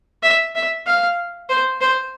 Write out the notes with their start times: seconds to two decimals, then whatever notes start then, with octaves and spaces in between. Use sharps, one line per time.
0.23 E5
0.55 E5
0.86 F5
1.49 C5
1.81 C5